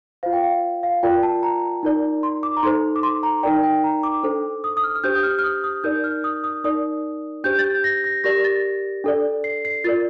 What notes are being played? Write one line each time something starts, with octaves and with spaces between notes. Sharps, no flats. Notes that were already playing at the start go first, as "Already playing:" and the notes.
F4 C5 F5
G5
F5
F5
F4 A#4 D5 G5
A5
A#5
D#4 A#4 D5
C6
D6
A#5
D#4 A4 C5 C6
D6
C6
A#5
D#4 A#4 D5 G5
G5
A#5
D6
D4 A4 C5
D#6
D#6
F6
F6
D4 G4 C5 G6
D#6
F6
F6
D#6
D#6
D#4 A#4 D5 G6
F6
D#6
D#6
D#4 A#4 D5 D#6
D4 G4 C5 G6
A6
G6
A#6
A#6
G4 A#4 D5 A#6
A6
D4 A4 D5
C7
C7
F4 A#4 D5 A6